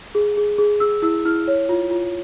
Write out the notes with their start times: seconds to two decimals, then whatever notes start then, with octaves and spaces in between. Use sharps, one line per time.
0.15 G#4
0.37 G#4
0.58 G#4
0.80 G#4 E6
1.02 E4 E6
1.25 E4 F6
1.48 C#5
1.69 F4
1.91 F4